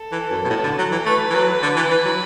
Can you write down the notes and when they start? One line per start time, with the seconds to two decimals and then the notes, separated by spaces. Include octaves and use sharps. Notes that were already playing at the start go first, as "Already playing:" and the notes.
Already playing: A4
0.12 E3
0.31 F#2
0.44 B2
0.50 A2
0.64 D3
0.78 F#3
0.92 E3
1.06 A3 B4
1.30 E3
1.34 F#3 B4
1.62 D3
1.76 E3
1.90 E3
2.05 F#3